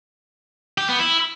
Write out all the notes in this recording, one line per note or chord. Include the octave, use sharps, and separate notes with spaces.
G4
B3
E4